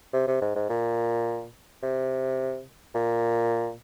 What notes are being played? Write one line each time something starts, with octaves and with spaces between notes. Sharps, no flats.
C3
C3
G#2
G#2
A#2
C3
A#2